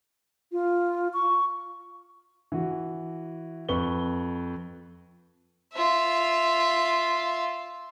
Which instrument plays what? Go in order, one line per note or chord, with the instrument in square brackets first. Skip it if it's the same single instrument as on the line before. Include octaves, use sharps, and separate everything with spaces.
[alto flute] F4
C#6
[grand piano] E3 F#4
F2 B4 C#6 G7
[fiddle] F4 E5